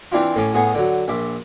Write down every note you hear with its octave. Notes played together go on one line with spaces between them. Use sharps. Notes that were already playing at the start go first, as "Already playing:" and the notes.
E3 C4 D4 E4 F4
A2 C#4 D6
A2 B3 G#4 C#5
D3 F#3
A#1 E5 D6